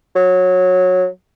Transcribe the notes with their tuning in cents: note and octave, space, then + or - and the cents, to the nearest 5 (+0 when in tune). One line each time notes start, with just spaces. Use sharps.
F#3 -15